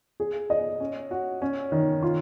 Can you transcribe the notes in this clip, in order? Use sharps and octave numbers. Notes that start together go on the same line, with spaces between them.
G#4
D#5
C#4
F#4
C#4
D#3
F4